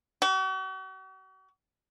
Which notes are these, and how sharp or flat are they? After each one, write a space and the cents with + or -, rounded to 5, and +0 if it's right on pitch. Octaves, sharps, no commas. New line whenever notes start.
F#4 +45